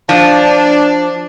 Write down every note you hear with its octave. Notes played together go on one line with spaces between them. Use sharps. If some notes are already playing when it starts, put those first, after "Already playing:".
F3 D4